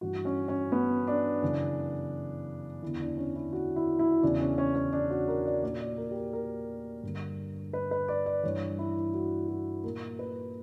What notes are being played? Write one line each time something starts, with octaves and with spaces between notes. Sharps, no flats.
G2 E3 F#4
C#4
C#4
B3
D4
F#2 C#3 E3
E2 D3 E4
D4
C#4
E4
F#4
E4
E4
E2 C#3 E3 D4
C#4
C#4
C#4
D4
F#4
A#4
D5
A#2 D5
D5
A#4
G4
A#4
A#4
G2 D3
B4
B4
D5
D5
G2 E3 C#5
E4
F#4
F#4
A#2 A#4
B4